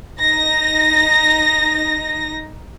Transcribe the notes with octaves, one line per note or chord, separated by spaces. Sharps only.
D#4 A#6